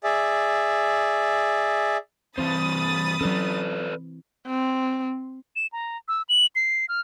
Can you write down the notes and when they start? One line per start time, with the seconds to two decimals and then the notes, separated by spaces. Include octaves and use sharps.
0.04 G#4 D5 E5
2.38 G2 E3 C4 C5 B5 D#6 A6
3.21 E3 F#3 C#4 A4 B4 D5
4.47 C4
5.56 E7
5.73 A#5
6.08 E6
6.29 F#7
6.56 C7
6.89 F6